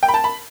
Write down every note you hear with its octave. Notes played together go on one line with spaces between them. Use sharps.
G5
B5
A5
B5